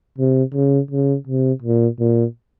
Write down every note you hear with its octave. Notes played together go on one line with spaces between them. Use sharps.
C3
C#3
C#3
C3
A#2
A#2